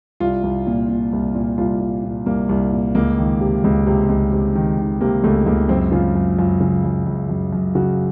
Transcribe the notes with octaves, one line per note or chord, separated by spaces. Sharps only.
C2 F4
C2
A#2
A#2
C2
A#2
C2 F4
A#2
A#2
C2 A#3
C2
A#2
C#2 A#3
D#3
C3
C#2
C3
C#2
C3
D#3
D#3
C3 A#3
C#2 A3
C#2 A#3
F#2 C4
C#3 F4
F#2
F#2 F4
C#3
F#2
F#2
F#2
F#2
C#3 F#4